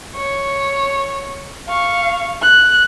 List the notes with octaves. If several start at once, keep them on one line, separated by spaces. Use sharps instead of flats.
C#5
F5 C#6
F#6